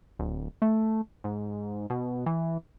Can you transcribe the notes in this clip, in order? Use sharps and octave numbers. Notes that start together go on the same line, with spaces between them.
D1
A3
G#2
B2
E3